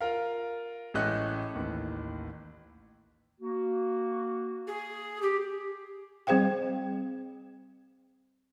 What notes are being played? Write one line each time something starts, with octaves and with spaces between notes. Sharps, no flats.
F4 A#4 F5
A1 G#3 A3 C#4 D#5 F#6
A1 D#2
A#3 F#4
G#4
G4
G3 C4 G#4 C5 F5 G5